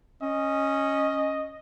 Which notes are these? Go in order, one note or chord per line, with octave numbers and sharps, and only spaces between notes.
C#4 D#5